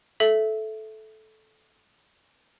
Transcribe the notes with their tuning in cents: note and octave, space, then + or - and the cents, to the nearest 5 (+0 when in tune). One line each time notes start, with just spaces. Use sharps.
A4 -15 E5 +5